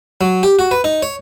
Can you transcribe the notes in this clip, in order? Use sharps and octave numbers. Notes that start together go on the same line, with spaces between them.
F#3
G4
F#4
B4
D#4
C#5